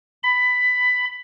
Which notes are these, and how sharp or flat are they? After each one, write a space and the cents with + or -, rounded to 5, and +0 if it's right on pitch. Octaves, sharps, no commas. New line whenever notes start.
B5 +15